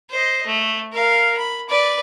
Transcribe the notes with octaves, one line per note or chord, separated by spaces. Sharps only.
C5 D#5
A3
A#4 F5
B5
B4 D5